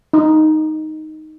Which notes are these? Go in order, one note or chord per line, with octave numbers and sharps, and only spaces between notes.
D#4